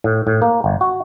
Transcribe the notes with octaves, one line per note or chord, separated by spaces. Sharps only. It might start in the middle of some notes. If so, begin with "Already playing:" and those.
A2
A2
A#3
G1
F#4